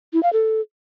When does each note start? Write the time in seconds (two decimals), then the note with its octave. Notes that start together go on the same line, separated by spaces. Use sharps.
0.13 E4
0.23 F5
0.33 A4